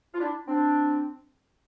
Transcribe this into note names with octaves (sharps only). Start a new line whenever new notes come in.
F4
D4 E4
C4 D4